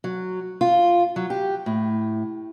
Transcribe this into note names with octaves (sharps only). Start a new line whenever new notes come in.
F#3
F4
F#3
G4
A2